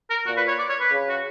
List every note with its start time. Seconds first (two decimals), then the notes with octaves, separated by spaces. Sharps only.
0.10 A#4
0.26 A#2 F#4
0.37 B4
0.48 C#5
0.58 D5
0.69 C#5
0.80 B4
0.91 C#3
1.09 F#4